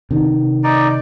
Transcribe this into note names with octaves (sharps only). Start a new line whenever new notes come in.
C3 D#3
D#4 D5